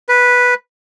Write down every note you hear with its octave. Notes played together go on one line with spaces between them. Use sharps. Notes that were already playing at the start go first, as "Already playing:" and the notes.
B4